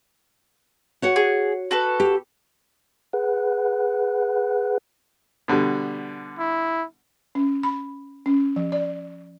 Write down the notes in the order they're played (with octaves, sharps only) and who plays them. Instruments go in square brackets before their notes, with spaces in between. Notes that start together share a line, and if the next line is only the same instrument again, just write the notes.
[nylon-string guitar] F#4 C#5 F#5
[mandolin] G#4
F#4 A4 B4
[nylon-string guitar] G4
[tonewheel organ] G#4 B4 F#5
[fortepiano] B2 D3 G3
[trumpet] E4
[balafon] C#4
B5
C#4
F3
D5